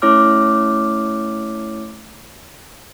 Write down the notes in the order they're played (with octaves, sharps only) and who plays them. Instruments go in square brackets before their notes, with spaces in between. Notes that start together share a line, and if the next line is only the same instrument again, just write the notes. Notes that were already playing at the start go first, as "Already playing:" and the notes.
[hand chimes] A3 C#4 E4 C#5 D6 F6